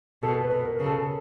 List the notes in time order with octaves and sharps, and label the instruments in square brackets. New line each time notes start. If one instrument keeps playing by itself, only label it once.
[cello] B2 [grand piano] A4
[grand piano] B4
[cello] B2
[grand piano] A#4
[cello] C#3
[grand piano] A4